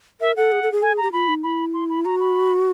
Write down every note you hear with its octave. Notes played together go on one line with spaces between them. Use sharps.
A#4 E5
A4 F#5
G#4
A4
G#4
A4 G#5
G#4
G4 A#5
F4 B5
D#4
E4 B5
C6
B5
F#4 A#5
B5